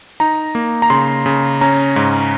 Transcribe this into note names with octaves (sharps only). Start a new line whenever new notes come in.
D#4 A#5
A#3
A#5
C#3 C6
C#3
C#4 A#5
G#2